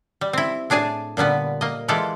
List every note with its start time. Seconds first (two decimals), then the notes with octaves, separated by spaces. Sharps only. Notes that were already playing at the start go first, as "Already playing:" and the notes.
0.21 G3
0.33 C4 E4
0.70 A2 D4 G#4 G#5 A5
1.17 A#2 D3 G3 B3 B4
1.61 A#3 D#5
1.88 E3 G#3 F4 G4 A4 D5